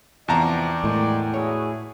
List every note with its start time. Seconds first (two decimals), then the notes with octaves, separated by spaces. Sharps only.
0.28 E2 C3 F3 D5 G5 A5 A#5
0.84 A2 D#3 G#3
1.34 E4 F#4 G#4 C#5